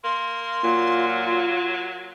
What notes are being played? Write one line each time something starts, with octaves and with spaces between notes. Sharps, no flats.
A#3 C6
A#2 F#3 F4